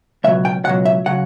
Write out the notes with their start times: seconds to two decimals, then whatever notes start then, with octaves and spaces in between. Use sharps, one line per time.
0.24 C#2 B2 F#3 E5
0.45 G5
0.65 C#2 B2 F#3 F#5
0.85 E5
1.06 C#3 F#3 F#5